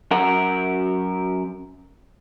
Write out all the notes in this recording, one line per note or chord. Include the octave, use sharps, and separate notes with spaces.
F#2 A#4 F#5